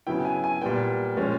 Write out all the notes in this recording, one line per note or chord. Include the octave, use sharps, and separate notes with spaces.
C#3 F#3 B3 E4 G5
G#5
G#5
A#2 G3 B3 G5
A#2 F3 G#3 C#4